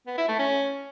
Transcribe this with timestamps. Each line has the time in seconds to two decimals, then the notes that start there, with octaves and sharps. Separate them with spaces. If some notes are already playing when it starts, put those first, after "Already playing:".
0.07 B3
0.18 E4
0.28 A3
0.39 C#4